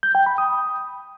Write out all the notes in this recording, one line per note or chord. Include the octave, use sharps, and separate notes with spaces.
G6
G5
B5
D#6